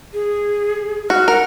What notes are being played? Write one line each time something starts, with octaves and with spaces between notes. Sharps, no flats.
G#4
F#4 F6
A#4 F#5